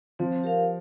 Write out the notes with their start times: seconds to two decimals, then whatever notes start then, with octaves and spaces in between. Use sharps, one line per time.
0.19 F3 C4
0.44 G4 A#4 F5